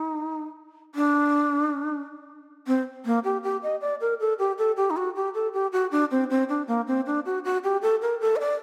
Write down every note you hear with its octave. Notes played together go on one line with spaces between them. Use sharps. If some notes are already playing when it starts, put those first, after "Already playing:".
Already playing: D#4
D4
C4
A#3
G4
G4
D#5
D5
A#4
A4
G4
A4
G4
D#4
F#4
G4
A4
G4
F#4
D4
C4
C4
D4
A#3
C4
D4
F#4
F#4
G4
A4
A#4
A4
D#5
D5